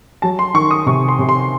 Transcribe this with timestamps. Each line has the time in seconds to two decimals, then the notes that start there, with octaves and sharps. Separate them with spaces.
0.22 F#3 A5
0.39 C6
0.54 D#3 C#6
0.71 D#6
0.86 C3 C#6
1.08 C6
1.19 C3
1.29 C6